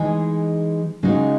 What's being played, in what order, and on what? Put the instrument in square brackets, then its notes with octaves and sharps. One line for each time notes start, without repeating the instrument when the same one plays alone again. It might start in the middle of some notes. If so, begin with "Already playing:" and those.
Already playing: [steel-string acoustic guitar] E3 G#3 D#4 G#4
C#3 G#3 D#4 F#4